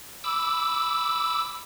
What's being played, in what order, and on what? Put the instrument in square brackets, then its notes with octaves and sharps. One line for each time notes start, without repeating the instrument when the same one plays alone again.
[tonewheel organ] B5 D6 E6